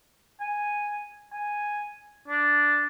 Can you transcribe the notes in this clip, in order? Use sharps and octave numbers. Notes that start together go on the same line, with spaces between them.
G#5
G#5
D4